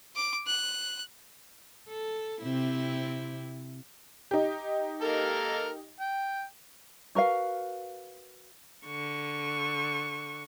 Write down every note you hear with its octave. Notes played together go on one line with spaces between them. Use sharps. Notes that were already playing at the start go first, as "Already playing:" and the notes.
D6
F#6
A4
C3 C4 E4
D#4 G4
A#3 A4 A#4
G5
F#4 A#4 B4 F5
D3 C#6